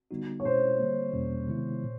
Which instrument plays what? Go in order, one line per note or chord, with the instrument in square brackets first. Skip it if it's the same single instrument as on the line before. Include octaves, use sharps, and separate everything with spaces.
[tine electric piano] D3 G3 B3 D#4 F#4
[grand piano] C#5
[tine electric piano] B2 G#3 C#4 E4 [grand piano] C5
[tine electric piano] D3 G3 A#3
E2 B2 G3 A#3 C#4
C3 D#3 G#3 B3 E4
A#2